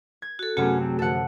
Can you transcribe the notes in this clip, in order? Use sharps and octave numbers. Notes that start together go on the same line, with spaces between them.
G#6
F#4 A4
F#2 C3 A3 B3 C#4 F#4 G#4
F#3 C4
F#2 D3 F3 A4 F#5